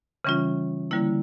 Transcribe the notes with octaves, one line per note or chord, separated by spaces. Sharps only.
C#3 E3 G3 C#4 F4
D3 G3 A#3 E4